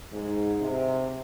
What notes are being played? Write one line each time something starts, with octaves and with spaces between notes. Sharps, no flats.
G#2
C3